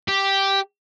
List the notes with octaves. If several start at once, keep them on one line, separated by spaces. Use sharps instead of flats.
G4